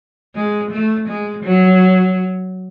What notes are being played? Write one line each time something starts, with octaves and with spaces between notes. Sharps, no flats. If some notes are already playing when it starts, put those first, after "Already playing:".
G#3
A3
G#3
F#3